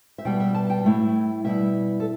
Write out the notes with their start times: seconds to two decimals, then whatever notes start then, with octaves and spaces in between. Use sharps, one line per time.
0.18 E5
0.25 B2 G3 B3 G5
0.40 E5
0.54 A5
0.70 G5
0.85 A2 A3 E4
1.44 B2 G3 E4 E5
2.00 A4